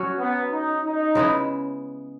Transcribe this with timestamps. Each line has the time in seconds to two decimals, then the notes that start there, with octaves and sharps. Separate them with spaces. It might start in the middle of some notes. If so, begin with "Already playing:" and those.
Already playing: F#3 C#4 F#4
0.18 B3
0.51 D#4
0.84 D#4
1.15 C#3 G#3 B3 E4